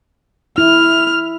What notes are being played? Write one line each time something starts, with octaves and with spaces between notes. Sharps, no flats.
E4 F6